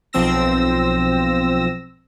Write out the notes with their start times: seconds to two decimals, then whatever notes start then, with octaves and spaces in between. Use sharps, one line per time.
0.13 B1 F3 C4 E6 A#6